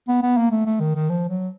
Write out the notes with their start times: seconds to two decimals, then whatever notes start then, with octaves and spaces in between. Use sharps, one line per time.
0.08 B3
0.22 B3
0.37 A#3
0.51 A3
0.66 A3
0.80 D#3
0.95 D#3
1.10 F3
1.29 F#3